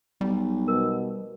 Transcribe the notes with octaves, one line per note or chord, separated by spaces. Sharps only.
B1 G3
B2 A#4